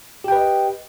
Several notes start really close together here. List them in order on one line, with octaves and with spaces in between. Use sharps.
G4 G5 B4 D#5